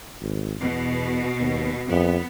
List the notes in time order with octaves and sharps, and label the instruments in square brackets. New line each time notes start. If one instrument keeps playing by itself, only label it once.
[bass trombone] G#1
[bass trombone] E2 [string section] B2
[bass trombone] D#2
[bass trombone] F2 [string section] B3